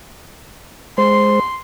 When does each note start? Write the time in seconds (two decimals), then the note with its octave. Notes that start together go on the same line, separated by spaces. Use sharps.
0.98 G#3 C5 C6